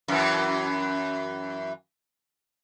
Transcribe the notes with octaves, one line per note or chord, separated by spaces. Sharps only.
F#2 E3